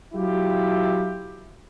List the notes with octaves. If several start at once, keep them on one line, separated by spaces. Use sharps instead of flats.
F#3 E4 F4 G4